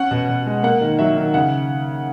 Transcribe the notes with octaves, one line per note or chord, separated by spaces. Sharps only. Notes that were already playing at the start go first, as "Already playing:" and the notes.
Already playing: C#4 F#5
B2
B2
G#3
A#3 F#5
D#3
F#3 E5
D#3
C#3 F#5